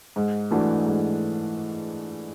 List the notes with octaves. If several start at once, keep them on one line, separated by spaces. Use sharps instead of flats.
G#2
E3 A3 D4 F#4
G#2